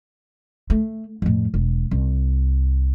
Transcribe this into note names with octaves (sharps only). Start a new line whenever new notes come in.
A3
F2 A2
E1
C2